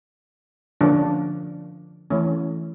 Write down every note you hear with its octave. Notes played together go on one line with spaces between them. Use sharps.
D3 F3 A#3 C#4 D4
E3 A3 C#4